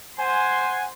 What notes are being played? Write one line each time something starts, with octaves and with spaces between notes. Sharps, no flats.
C5 F#5 G#5 C6